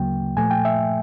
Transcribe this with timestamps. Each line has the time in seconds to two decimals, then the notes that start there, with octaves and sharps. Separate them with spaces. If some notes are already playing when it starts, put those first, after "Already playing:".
Already playing: D2 C#3 F#3 A#3 G5
0.37 A#2 F3 A3 G#5
0.51 G5
0.65 E5